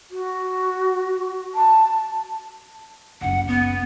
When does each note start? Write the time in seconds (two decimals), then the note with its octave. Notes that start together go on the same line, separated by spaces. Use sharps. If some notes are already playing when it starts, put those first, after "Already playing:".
0.11 F#4
1.54 A5
3.21 F#1 C#2 F#5
3.47 B3